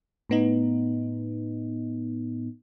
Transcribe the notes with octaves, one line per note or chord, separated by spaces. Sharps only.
A2 B3 D#4